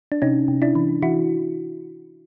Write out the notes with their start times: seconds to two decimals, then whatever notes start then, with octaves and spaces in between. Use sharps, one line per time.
0.12 D4
0.22 C3 C#4 D#4
0.48 C3
0.62 D4 E4
0.75 E3
1.02 E3 E4 F#4